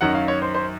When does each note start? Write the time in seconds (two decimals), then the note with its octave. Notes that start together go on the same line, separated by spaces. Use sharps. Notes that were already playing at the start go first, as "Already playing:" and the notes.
0.01 F#2 D#3 F#3 F#5
0.15 F5
0.28 C#5
0.42 C5
0.55 C5